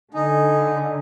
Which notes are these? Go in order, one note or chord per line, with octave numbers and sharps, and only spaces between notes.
D3 D#4 A4 G#5